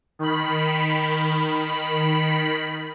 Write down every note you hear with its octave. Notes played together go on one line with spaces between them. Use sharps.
D#3 B5